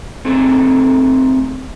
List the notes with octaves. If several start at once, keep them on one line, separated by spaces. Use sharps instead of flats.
A3 C4 D#4 G#4 A4